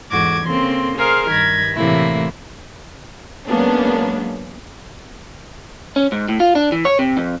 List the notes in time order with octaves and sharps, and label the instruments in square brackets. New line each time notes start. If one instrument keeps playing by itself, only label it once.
[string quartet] E2 G#2 F#4 A4 D6 G#6
C#3 A#3 C4 A4 C6
G#4 A#4 C5 F5
G2 D#3 B5 G#6 A#6
A2 C3 E3 A3 A#3 E4
[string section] F#3 G#3 A#3 B3 C#4 D4
[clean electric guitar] C#4
G#2
A2
F4
D4
E3
C#5
C3
F2